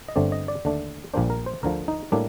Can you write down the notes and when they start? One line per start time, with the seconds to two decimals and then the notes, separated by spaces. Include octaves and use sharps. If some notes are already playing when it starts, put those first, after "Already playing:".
0.08 D#5
0.16 G1 G2 D3 A3 C4 D5
0.32 D#5
0.48 D5
0.65 D#2 D3 A3 D4
1.14 A#1 A#2 G3 A#3 D4 C5
1.30 A#4
1.46 C5
1.63 D2 D3 F3 A#4
1.88 D#4
2.12 A2 G3 A#3 D4